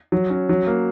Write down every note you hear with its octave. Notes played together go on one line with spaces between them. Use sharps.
F#3
C#4
F#3
A#3